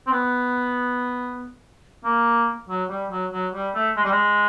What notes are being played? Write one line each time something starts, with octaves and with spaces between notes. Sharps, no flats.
C4
B3
A#3
F#3
G3
F#3
F#3
G3
A3
G#3
G3
G#3